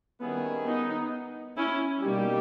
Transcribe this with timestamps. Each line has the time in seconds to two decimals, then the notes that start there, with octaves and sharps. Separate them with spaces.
0.21 D#3 G3 B3 C#4 E4 G#4
0.66 B3 D#4
1.57 C#4 E4
2.02 B2 G3 A#3 D#4 G4